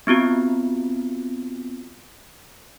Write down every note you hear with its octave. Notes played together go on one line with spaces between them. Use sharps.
B3 C4 F4 F#4